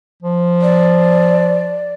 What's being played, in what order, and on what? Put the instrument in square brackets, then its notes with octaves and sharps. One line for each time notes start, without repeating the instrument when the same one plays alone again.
[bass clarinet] F3
[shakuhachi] D5